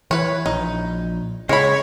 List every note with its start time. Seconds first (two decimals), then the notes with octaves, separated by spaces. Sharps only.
0.11 E3 B4 C#5
0.46 A#1 D#4
1.49 C#3 G#3 C#5 B5